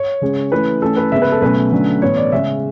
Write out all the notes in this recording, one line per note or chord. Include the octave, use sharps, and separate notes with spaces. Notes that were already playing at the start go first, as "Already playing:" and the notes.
Already playing: C#5
C#3 G#3 C#4
E3 A3 C#4 B4
E3 A3 C#4 A4
B4
C#3 G#3 B3 E5
B4
A4
B2 F#3 A3 C#4 B4
D3 F#3 A3 C#4
A2 E3 B3 C#5
D5
C#3 G#3 C#4 E5